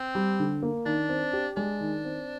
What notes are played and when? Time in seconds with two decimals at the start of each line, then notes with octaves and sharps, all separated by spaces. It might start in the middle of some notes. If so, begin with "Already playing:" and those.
Already playing: C4
0.15 G3
0.40 D3
0.63 A#3
0.86 D#3 D4
1.09 C4
1.33 G4
1.56 G#3 D4
1.80 D#3
2.05 C4